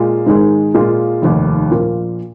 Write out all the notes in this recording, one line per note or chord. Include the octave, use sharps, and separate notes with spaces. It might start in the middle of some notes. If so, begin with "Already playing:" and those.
Already playing: A#2 G#3 F4
G#2 D#3 G#3
A#2 G#3 F4
F1 D#2 D#3
A#1 A#2 A#3 F4